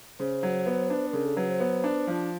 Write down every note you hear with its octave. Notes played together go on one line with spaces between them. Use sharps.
C#3 C5
F#3
B3
D4
B4
C#3 A#4
A4
F#3 B4
C5
B3
D4
F3